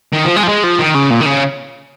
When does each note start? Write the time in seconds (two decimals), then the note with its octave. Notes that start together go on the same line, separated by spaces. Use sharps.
0.13 D#3
0.25 F3
0.36 G#3
0.43 F3
0.48 G#3
0.64 F3
0.79 D#3
0.95 C#3
1.10 A#2
1.20 D#3
1.26 C#3